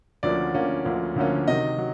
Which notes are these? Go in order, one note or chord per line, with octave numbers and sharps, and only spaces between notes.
D2 D3 F3 A#3 C#4 D5
D2 D3 F3 A#3 C#4
D2 D3 F3 A#3 C#4
D2 D3 F3 A#3 C#4
C3 D#3 F#3 D#5
F#3